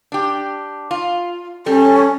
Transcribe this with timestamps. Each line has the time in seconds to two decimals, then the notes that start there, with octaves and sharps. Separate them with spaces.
0.12 D4 G4
0.91 F4
1.66 G3 C#4 A4